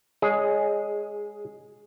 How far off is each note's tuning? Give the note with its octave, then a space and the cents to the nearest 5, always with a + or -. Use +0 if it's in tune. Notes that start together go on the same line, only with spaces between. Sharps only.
G#3 -10 G#4 +5 C#5 +10